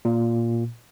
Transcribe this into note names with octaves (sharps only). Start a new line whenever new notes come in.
A#2